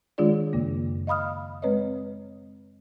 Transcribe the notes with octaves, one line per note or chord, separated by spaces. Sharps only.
D#3 G#3 D4 F4 G#4 D5
F#2 C#3 A#3
D#5 F5 B5 D#6 F6
G#3 C4 B4 C#5 D#5